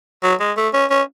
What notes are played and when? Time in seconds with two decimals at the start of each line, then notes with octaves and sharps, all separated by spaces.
0.23 F#3
0.40 G#3
0.57 A3
0.74 C#4
0.90 C#4